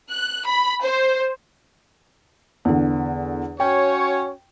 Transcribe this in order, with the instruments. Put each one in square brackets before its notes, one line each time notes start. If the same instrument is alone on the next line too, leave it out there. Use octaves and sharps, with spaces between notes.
[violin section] F#6
B5
C5
[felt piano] E2 D3
[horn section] C#4 F#4 C#5 [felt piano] G5